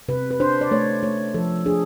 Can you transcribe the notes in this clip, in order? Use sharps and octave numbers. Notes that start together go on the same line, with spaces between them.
C3 B4
B4
D4 C5
D5
A3 C#5
A3 C#5
F3 A4
D4 G#4